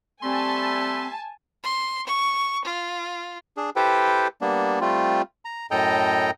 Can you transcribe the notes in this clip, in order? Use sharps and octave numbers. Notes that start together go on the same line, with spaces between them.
G3 A3 C4 G#5 A5 B5 C6
C6
C#6
F4
D4 G#4
E4 G4 A4 B4 C5 G5
G3 A#3 B3 D4
G3 A3 C4 F4
A#5
F#2 A2 A4 D#5 G5 A#5